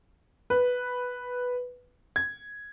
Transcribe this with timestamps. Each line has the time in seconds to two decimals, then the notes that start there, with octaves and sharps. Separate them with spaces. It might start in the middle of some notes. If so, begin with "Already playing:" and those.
0.50 B4
2.16 G#6